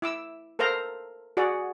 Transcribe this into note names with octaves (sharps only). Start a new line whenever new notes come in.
E4 D6 E6
A4 A#4 C5 F5 A#5
F#4 G#4 D5 F#5